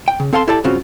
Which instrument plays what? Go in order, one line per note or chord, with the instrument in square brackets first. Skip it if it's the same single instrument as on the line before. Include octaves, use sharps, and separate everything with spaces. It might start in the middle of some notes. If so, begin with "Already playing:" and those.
[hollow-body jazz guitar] G5
C#3
C4 A4 F5 A5 C6
E4 G4 A4 D5 G5 A5
C#2 G2 C#3 C4 F4 F#4